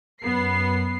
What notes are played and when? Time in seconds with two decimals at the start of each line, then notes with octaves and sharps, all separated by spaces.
0.23 F#2 B3 C7